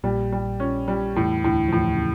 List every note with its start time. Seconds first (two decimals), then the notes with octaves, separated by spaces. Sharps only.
0.03 A#1 A#2 G3
0.32 G3
0.60 C#4
0.88 G3
1.16 E2 A2 E3
1.38 E3
1.44 D2 A2 D3
1.68 F3
1.72 E2 A2 E3
1.95 C#3